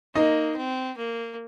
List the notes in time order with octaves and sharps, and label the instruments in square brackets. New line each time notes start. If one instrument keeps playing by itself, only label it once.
[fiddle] A#3 [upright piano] D#4 D#5
[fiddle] C4
A#3